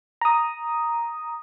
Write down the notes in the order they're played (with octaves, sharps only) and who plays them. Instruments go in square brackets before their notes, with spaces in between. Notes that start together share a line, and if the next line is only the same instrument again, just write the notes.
[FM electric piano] A#5 D#6